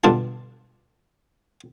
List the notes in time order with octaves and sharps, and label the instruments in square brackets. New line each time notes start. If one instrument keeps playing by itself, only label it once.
[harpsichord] G2 B2 D3 D4 F4 A5